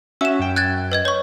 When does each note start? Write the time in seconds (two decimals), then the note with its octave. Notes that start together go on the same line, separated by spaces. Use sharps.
0.21 C#4 F#4 E5 E6 E7
0.39 F#2 G5
0.56 F#6 G#6 A6
0.92 B4 D#5 G#6
1.05 C#5 C#6